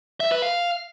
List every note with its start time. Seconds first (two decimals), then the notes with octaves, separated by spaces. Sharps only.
0.20 E5
0.31 B4
0.42 F5